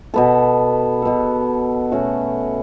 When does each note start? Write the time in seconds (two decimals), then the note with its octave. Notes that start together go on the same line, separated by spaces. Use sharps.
0.14 B2 B3 A4
1.02 B2 B3 A4
1.92 B2 A3 C#4 F#4